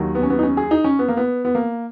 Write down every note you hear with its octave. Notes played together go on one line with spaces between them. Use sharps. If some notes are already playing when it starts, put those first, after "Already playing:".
Already playing: D#2 D#3 F#3
B3
C#4
B3
D#4
C#4
G#4
D#4
C#4
B3
A#3
B3
B3
A#3